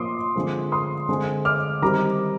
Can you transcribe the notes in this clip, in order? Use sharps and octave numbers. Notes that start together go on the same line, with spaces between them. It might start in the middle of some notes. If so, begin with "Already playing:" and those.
Already playing: A#2 F3 A#3 C6 D6 D#6
D3 F3 G#3 C4
C6 D#6
D3 G#3 C4
D6 F6
D#3 G3 C4 A#5 D6